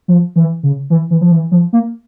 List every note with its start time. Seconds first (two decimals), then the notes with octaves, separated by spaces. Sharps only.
0.08 F3
0.36 E3
0.63 C#3
0.90 E3
1.11 E3
1.21 F3
1.32 E3
1.52 F3
1.73 A#3